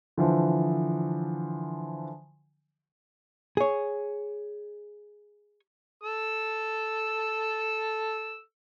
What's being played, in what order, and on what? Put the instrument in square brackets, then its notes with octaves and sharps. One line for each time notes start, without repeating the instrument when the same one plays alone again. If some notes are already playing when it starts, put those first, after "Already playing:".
[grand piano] D3 E3 F3 C5
[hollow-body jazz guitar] G#4 C#5
[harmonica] A4 E6